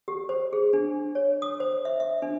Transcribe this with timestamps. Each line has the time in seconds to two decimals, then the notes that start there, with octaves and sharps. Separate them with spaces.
0.08 G4
0.29 C5
0.53 G#4
0.73 D4
1.15 C#5
1.42 D#6
1.60 C5
1.85 E5
2.00 E5
2.22 D4